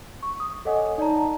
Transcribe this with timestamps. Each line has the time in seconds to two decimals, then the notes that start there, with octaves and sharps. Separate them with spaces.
0.23 C#6
0.40 D#6
0.65 A4 C#5 D#5 F#5 G#5 D#6
0.98 D#4 D5 A5 A#5